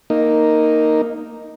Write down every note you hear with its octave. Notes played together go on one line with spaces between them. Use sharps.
A#3 D#4